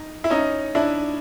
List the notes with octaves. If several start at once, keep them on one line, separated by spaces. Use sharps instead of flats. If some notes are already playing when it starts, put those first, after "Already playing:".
Already playing: D#4
E4
C#4 D#4
D4 E4